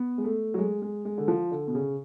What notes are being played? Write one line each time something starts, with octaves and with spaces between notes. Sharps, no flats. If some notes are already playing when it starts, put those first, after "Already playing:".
Already playing: B3
G#3
A3
F#3
G#3
G#3
G#3
D3
F3
D3
B2
C#3